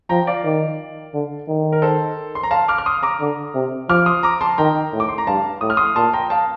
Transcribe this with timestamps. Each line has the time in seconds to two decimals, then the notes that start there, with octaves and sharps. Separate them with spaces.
0.09 F3 G5 A#5
0.27 D5 F5
0.44 D#3
1.14 D3
1.48 D#3
1.72 A#4
1.82 A4 C5
2.35 C6
2.43 A#5
2.51 F5 A5
2.68 D6 F6
2.78 F6
2.86 C6 D#6
3.03 A#5 D6
3.20 D3
3.54 C3
3.89 F3 D6 F6
4.06 C6 D#6
4.23 A#5 D6
4.41 A5 C6
4.58 D#3 G5 A#5
4.93 A2
5.00 D6
5.09 C6
5.18 A#5
5.27 G2 F5 A5
5.61 A2 D#6
5.70 F6
5.77 C6 D#6
5.96 A#2 A5 C6
6.13 G5 A#5
6.30 F5 A5